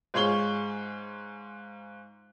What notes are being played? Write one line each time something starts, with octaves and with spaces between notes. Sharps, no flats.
G#2 F4 G#4 C#5 G7